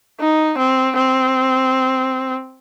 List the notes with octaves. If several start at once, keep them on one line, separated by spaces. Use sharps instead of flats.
D#4
C4
C4